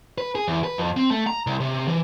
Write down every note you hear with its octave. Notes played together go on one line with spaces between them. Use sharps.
B4
G#4
E2
B4
F2
C4
A3
A#5
C2
C3
E3